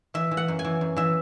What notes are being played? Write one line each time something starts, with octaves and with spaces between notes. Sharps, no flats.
E3 E5
E3
F#5
F#2
G#5
E3
F#2
E3 E5